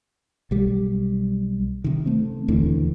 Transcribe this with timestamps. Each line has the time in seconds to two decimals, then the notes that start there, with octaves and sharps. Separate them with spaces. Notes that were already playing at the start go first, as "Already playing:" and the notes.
0.51 B1 G3
1.84 C3 D#3
2.06 A3 C4
2.48 D#1 D#2 D3 E3